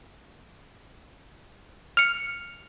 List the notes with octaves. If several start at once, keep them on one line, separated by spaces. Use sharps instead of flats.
F6 C#7